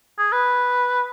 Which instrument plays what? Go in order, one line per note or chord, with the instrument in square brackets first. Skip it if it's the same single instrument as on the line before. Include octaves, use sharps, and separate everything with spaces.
[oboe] G#4
B4